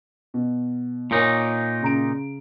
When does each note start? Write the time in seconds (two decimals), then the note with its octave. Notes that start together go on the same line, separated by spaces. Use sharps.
0.34 B2
1.11 A#2 D#4 A#4 C#5 G#5
1.82 C#3 A#5 D7